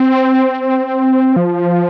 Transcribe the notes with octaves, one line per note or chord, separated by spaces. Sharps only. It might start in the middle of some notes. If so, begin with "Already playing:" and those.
Already playing: C4
F3